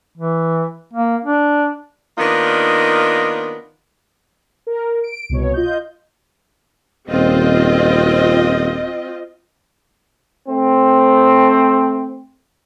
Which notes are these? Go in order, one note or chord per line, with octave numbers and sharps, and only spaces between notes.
E3
A#3
D4
D#3 A#3 B3 D4 D#4 F4
A#4
D7
C2 B2 C#5
F4 D#5 G6
D#1 C4 F4 D#5
A3 C4